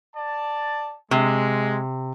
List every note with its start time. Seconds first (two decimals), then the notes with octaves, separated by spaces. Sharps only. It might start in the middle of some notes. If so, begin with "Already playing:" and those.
0.15 D5 A5
1.11 C3 G#3